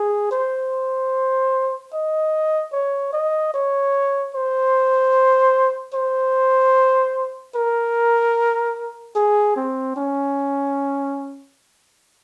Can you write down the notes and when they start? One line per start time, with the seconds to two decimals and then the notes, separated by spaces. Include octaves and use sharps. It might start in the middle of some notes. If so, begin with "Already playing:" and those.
Already playing: G#4
0.31 C5
1.93 D#5
2.72 C#5
3.13 D#5
3.54 C#5
4.34 C5
5.94 C5
7.55 A#4
9.15 G#4
9.56 C4
9.96 C#4